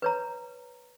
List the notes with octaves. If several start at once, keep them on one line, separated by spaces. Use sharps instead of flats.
B4 C#5 A#5